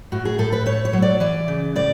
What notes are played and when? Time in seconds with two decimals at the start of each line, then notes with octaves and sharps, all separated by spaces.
0.12 A2 F#4
0.25 G#4
0.38 A2 A4
0.52 B4
0.66 A3 C#5
0.85 C#5
0.93 F#3
1.02 D5
1.20 E3 D5
1.48 C#3
1.76 A2 D5